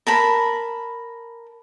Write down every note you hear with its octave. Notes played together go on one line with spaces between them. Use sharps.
A#4 A5 B5